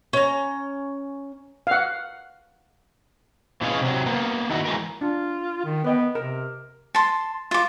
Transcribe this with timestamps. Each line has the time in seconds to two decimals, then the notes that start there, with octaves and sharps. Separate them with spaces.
0.13 C#4 A#5
1.67 F5 F#5
3.61 A#2 E3 G#3 C#4 G#4 F5
3.81 C3 F#3
4.06 A#3 B3
4.49 D#3 E4 F#4
4.65 E3 G#3 A#4
5.01 D4 F4
5.65 D#3
5.85 B3 B4 D#5 G5
6.15 C3 A#4
6.95 A5 C6
7.51 F4 D6